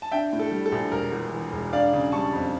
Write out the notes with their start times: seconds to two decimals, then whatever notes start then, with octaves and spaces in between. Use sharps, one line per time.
0.02 A5
0.11 D4 E5 G5
0.33 A2
0.39 A4
0.52 G3
0.66 A4
0.72 A#1
0.92 E1 A#4
1.12 E2
1.33 E3
1.52 E1
1.73 D4 D5 F5
1.93 C#3
2.12 G3 A5 C#6
2.33 F2